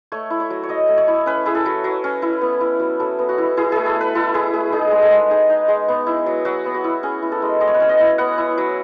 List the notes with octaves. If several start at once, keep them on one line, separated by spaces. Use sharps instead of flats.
A3 C#5
E4
C#5
F#3
C#5
F#3 D#5
A3
C#5
E4
C#4 B4
E4 G#4
A4
F#3
F#3
C#4
E4
B3
E4
F#3
F#3 A4
B3
F#4
E4
E4 G#4
A3 G#4
A4
A3
B4
E4 A4
E4 G#4
A3 G#4
D#4 G#4
G#3
A4
G#3
D#4 G#4
D#4
G#3
B3
E4
F#3
F#3 F#4
B3
F#4
E4
C#4 G#4
E4
A4
G#3
G#3 D#5
C#5
B4
C#4 C#5
D#5
E4
B3 F#5
E4
F#3